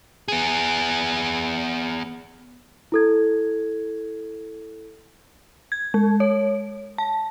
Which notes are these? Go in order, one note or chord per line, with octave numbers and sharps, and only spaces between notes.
B3 G#4
E4 A4 G#6
G#6
G#3
C#5
A5